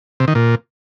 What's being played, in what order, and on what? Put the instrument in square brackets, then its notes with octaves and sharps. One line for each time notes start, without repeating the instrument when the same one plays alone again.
[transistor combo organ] C3
D#3
A#2